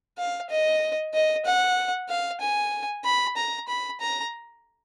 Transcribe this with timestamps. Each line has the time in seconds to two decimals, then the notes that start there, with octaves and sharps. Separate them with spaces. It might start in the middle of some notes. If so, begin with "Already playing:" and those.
0.18 F5
0.50 D#5
1.14 D#5
1.45 F#5
2.09 F5
2.40 G#5
3.05 B5
3.37 A#5
3.68 B5
4.00 A#5